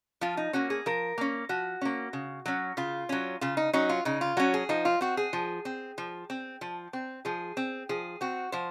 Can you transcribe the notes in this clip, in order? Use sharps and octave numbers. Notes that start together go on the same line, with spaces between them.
F3 F4
D#4
A#3 C#4 F#4
G#4
F3 A#4
A#3 C#4
F3 F#4
A#3 C#4
C#3
F#3 C#4
C#3 F4
F#3 C#4
C#3 F4
D#4
F#3 C#4 D#4
F4
C#3 D#4
F4
F#3 C#4 F#4
G#4
F3 D#4
F4
C4 F#4
G#4
F3
C4
F3
C4
F3
C4
F3 G#4
C4
F3 G#4
C4 F#4
F3 C5